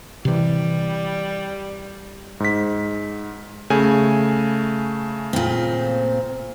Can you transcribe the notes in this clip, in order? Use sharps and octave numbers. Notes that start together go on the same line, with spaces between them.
C3 E3 G3
G#2 B6
C#3 A3 G#5
A#2 C4